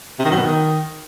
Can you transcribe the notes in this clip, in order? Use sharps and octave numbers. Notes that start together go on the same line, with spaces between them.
C3
D#3
F#2
B2
D#3